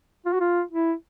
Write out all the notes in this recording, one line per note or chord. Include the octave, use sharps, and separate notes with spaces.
F4
F#4
F4
E4